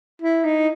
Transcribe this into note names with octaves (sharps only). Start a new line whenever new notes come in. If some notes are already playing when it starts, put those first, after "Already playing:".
E4
D#4